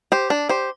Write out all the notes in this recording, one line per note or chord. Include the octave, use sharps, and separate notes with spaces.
G4 C5
D4
G4 C5